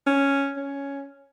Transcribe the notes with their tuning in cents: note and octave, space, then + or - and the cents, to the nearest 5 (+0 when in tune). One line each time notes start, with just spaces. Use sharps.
C#4 +0
C#4 +5